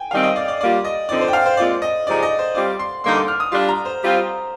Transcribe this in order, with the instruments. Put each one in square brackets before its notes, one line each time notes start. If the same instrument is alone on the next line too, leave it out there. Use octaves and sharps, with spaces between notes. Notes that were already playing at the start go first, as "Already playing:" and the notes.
Already playing: [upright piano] G5 G#5
[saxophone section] D#3 G3 C4 D#4 [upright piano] F5
[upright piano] D#5
D5
D5
[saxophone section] G3 A#3 F4 [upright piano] D5
[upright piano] D#5
[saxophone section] D3 F3 C4 D#4 [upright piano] D5
[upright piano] C5
G5
F5
C5
[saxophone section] A#2 G#3 C4 F4 [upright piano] D5
[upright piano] D#5
[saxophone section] C3 F3 G#3 D#4 [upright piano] D5
[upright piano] D#5
C5
[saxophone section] G3 C4 F4 [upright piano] D5
[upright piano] C6
[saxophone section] D3 G3 A#3 D#4 [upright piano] C6
[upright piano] D6
F6
D#6
[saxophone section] G3 D4 F4 [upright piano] C6
[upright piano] A#5
C5
[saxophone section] G3 C4 F4